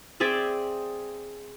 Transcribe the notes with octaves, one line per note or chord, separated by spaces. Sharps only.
C4 G#4 D5 E5